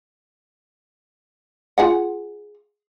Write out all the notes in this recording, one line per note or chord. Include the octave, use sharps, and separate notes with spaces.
F4 G#4 F#5